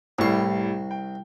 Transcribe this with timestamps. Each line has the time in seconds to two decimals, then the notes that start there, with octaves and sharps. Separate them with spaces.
0.19 C2 A2 G3 C#6 C7
0.91 G5